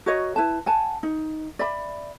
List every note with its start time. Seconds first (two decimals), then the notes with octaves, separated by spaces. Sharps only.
0.06 F#4 A#4 C#5 D#5
0.36 E4 B4 A5
0.66 F#5 G#5 A5
1.03 D#4
1.59 D5 E5 B5